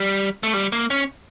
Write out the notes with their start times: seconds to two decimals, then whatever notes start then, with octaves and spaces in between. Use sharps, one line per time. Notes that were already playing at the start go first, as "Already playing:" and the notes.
Already playing: G3
0.43 A3
0.54 G3
0.72 A#3
0.90 C#4